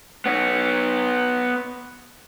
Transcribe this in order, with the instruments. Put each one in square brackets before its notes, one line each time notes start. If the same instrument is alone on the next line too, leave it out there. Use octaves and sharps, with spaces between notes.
[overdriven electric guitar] B3 C#5